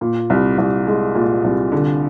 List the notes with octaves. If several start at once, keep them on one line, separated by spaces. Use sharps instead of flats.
A#2
C2
C2
G#3
A#2
C2
D3